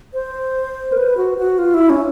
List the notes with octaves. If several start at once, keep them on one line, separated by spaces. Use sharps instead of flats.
C5
A#4
B4
F#4
F#4
F4
E4
C#4